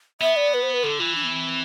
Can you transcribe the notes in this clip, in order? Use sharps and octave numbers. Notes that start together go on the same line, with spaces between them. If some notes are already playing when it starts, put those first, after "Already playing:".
B3 E5
D5
B4
C5
B4
D3 A4
E3 F4
D4
B3
C4